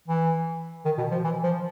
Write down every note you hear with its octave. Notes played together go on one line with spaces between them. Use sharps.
E3
D#3
B2
F3
E3
F3